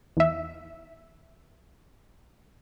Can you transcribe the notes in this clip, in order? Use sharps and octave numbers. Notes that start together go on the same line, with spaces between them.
E2 E5